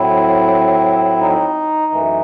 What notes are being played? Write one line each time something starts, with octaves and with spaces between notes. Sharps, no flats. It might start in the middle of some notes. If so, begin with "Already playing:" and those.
Already playing: A2 F#3 C4 E4
D#4
F#2 E3 A3